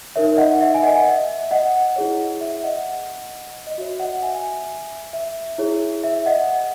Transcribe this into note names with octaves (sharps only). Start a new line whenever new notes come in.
D#4 A#4 C#5 E5
D#5 F#5
E5
G#5
D#5 F#5
D#5
E5
D#5 F#5
E4 G#4 C#5
E5
D#5 F#5
D#5
F#4 C#5 E5
D#5 F#5
E5 G#5
E5
E4 G#4 C#5
E5
D#5 F#5